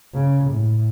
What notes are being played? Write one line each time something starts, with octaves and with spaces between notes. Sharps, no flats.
C#3
A2